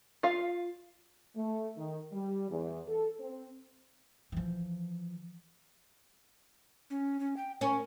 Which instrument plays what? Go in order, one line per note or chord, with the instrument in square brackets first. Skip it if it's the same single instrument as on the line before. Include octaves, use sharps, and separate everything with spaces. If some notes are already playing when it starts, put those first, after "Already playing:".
[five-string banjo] F4 F5
[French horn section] A3
D#3
G3
E2
A4
C4
[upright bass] E3 F3
[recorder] C#4
C#4
G5
[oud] C#4 [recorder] A#4